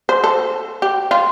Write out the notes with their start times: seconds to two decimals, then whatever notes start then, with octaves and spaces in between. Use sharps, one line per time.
0.09 C5
0.24 A4
0.82 G4
1.11 F4